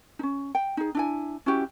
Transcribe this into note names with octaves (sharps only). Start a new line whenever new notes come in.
C#4 D#4
G5
D#4 G#4
D4 E4 G#5
C#4 E4 F#4 G4